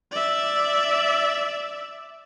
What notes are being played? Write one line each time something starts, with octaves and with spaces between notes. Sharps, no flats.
D5 E5